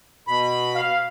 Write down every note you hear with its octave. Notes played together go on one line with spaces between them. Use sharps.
B2 B5
F5